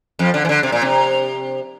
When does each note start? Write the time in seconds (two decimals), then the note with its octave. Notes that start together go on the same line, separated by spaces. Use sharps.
0.19 F2 F3
0.34 D3
0.45 E3
0.49 D3
0.63 C3
0.72 A#2
0.82 C3